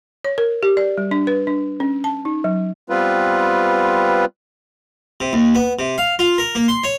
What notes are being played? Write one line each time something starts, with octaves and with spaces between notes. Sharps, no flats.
C#5
A#4
G4
D5
G3
D4
B4
D4
C#4
A5
D#4
F#3
G3 B3 C4 F4 B4
C3
D#2
B3
C3
F5
F4
A#4
A#3
C6
C#5